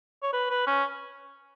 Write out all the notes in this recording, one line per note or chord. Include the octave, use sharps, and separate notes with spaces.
C#5
B4
B4
C#4